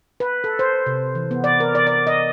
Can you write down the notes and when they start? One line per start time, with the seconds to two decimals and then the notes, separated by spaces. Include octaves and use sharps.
0.20 B4
0.44 A4
0.59 C5
0.86 C3
1.15 E3
1.31 B3
1.44 D5
1.60 A#4
1.75 D5
1.87 D5
2.07 D#5